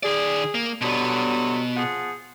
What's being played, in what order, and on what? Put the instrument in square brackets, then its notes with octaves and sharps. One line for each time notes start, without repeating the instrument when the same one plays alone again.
[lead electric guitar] D#3 D5 [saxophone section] G#4
[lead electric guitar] A#3
[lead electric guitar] B2 B3 [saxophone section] D3 F#3 G3
[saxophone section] F3 G#4 F#5